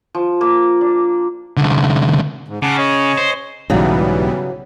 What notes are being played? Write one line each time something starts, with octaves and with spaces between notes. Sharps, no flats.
F3
A#3
D4
C2 D3
G#2
C#3 F#5 A5 D6
C#5 D#5
C5
B1 G#2 C#3 E3 F#3 G3 B3